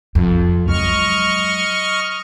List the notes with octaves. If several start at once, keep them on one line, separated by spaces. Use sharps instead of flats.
F2
F#3 G#3 D#5 C#6 F6